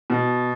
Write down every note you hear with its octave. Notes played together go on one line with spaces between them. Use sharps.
B2